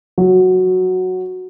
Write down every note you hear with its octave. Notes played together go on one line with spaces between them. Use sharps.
F#3